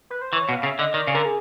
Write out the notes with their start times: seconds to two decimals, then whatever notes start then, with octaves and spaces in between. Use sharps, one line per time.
0.10 B4
0.22 C5
0.33 E3 C#5
0.49 B2
0.53 F5
0.63 C#3
0.66 E5
0.79 D3 D#5
0.94 D#3 D5
1.07 C#3
1.14 D3 A#4
1.25 G#4